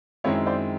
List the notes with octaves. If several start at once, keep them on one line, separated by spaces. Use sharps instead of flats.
F#2 D#3 G#3 C4 E4 C#5 D#5
C5 D5